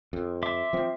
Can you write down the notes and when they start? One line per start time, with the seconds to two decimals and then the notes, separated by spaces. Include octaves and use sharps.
0.13 F2
0.43 E5 C6 D6
0.73 F3 C4